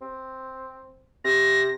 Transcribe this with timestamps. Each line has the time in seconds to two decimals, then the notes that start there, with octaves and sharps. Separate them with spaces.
0.01 C4
1.24 C3 A#6